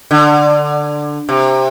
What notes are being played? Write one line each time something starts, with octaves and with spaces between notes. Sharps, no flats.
D3
C3